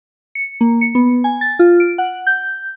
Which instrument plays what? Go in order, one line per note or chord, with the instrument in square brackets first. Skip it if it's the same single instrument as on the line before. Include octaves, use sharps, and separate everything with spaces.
[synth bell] C#7
A#3
C#7
B3
G#5
A6
F4
D7
F#5
G6